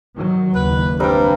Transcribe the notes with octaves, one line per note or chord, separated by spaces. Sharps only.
D#3 F#3
F#1 D#2 B4
G2 G3 C4 A#4